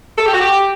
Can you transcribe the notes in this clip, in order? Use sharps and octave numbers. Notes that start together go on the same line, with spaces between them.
A4
G4
F#4
G4